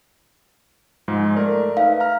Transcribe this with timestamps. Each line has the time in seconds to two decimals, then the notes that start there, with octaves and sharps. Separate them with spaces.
1.08 G#2 F3 G#3
1.35 A3 A#4 D5
1.77 D#4 B4 E5 F5
2.00 A#5 F6